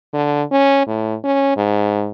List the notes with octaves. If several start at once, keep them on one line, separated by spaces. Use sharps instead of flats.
D3
C#4
A2
C#4
G#2